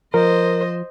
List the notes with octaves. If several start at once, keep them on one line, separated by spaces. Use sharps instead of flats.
F3 A#4 C5 D#5